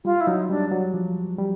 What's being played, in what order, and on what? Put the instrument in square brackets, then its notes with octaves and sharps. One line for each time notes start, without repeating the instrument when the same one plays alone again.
[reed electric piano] G3 [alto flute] F4
[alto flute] E4
[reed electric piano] F#3 [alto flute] D#4
[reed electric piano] G3 [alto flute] D4
[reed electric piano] F#3
F3
G3